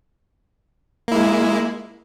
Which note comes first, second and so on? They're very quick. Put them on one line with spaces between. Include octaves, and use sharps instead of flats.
A#3 E4 G#3